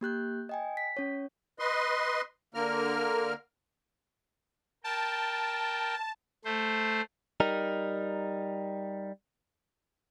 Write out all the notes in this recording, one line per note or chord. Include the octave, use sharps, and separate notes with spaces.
A#3 G4 F#6 G6
D#5 G5 G#5
B6
C#4 C#5
B4 D#5 C6
D3 A#3 A#4 F6
A#4 G5 A5
A3 C5
G3 D#4 A#4